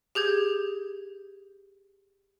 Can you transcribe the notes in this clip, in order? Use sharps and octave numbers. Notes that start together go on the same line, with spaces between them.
G4 G#4 G6 G#6